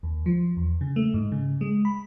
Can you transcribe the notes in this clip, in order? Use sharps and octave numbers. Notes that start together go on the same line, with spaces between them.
D#2
F3
E2
C#3
A3
G#2
C#3
G#3
B5